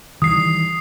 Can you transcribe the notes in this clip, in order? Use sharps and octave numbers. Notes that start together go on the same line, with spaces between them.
D#3 E3 G3 D#6 C7